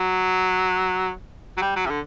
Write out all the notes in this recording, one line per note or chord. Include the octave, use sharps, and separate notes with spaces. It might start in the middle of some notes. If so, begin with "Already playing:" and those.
Already playing: F#3
F#3
G3
F#3
C3
D3